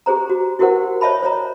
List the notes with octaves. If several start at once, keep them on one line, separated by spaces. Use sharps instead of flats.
G4 G#4 C5 A#5
F#4
E4 F#4 G4 A#4 C5 F#5
C5 C#5 D#5 E5 A5 B5
C5 C#5 D#5 A#5